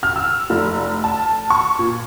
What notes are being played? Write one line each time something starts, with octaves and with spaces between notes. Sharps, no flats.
F6
E6
F1
A5
C#6
A#2